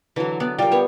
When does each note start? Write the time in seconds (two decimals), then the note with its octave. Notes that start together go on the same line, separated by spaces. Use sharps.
0.16 D3 E3 F#3
0.40 B3 D5
0.59 G3 F4 A#4 G5
0.72 B3 C#5